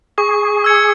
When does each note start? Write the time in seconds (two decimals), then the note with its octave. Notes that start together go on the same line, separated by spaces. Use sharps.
0.18 G#4 C#6
0.64 E6 G#6 C#7